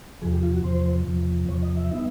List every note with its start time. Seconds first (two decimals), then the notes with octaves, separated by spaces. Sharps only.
0.22 E2 C3 F3 G#4
0.33 G4
0.43 F4
0.53 F#4
0.64 E2 C3 F3 C5
1.06 E2 C3 F3
1.48 E2 C3 F3 C#5
1.63 D#5
1.77 E5
1.92 G3 B3 D#4